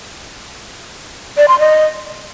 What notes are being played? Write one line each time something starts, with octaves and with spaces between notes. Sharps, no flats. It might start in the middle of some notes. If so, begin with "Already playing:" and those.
D5
C6
D#5